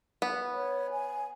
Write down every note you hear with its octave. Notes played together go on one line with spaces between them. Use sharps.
B3
C#5
G#5